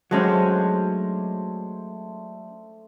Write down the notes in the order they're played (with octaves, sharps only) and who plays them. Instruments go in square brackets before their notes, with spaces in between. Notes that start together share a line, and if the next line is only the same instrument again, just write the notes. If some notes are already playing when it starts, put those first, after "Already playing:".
[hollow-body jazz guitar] F#3 G#3 C#4 [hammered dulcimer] A3 D4 C5